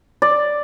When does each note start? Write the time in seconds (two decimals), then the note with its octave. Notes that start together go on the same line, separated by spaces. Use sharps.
0.22 D5